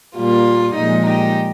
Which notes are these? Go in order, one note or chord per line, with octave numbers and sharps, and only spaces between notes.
A#2 G3 A#3 F4
A#2 F3 G#3 D#4
D#4 G4